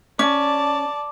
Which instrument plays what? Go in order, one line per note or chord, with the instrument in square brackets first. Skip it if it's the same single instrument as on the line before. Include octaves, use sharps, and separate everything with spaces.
[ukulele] C#4 [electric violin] D5 A5 [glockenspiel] D6